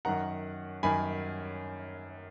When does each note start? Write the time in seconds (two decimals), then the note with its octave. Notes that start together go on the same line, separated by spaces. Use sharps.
0.05 F#2 D#3 F#5 A#5
0.83 F#2 D#3 G#5 B5